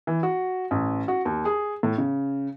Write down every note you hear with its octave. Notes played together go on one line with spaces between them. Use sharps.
E3
F#4
A1
F#4
D#2
G#4
A2
C#3